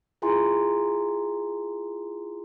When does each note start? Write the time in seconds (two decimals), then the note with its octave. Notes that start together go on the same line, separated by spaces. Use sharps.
0.22 E4 F4 G#4 G#5 A#5 C6